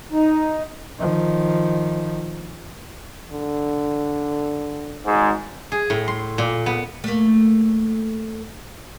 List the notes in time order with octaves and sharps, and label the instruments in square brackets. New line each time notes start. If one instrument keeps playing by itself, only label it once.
[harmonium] D#4
[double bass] D#3 F3
[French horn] D3
[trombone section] G#1 G#2 G#3
[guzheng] G#4
A2
C6
A#2
B3
[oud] A3 A#3